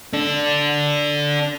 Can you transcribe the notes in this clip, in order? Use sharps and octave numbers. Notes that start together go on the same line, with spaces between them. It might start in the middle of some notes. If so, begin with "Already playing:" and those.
D4 A4